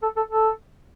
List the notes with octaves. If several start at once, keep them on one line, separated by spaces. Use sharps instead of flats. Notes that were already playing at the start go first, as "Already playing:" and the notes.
A4
A4
A4